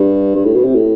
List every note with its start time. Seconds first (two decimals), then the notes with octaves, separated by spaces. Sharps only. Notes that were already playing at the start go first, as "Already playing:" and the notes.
Already playing: G2
0.36 G2
0.45 A2
0.55 B2
0.65 C3
0.75 A2